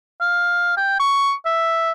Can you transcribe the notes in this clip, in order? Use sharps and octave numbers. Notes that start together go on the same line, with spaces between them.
F5
G5
C#6
E5